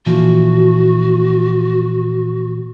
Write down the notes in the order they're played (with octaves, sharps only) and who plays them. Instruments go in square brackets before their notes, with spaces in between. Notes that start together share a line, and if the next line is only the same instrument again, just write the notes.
[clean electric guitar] A#2 E3 F3 [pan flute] F#4